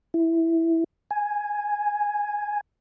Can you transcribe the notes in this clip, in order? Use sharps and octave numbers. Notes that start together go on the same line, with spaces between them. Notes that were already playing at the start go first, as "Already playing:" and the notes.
E4
G#5